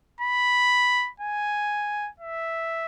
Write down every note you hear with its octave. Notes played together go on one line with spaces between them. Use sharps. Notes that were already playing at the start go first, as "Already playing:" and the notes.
B5
G#5
E5